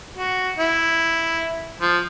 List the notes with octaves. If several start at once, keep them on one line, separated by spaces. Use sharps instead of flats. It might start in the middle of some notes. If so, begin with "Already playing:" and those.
F#4
E4
F3